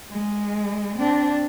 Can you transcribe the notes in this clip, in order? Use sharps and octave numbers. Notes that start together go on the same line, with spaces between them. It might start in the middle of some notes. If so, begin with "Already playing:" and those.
G#3
C4 D4